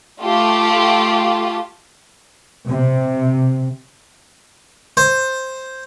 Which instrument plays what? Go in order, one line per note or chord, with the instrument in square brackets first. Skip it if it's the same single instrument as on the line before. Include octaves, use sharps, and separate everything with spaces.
[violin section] A3 F4 G4
[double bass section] C3
[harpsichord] C5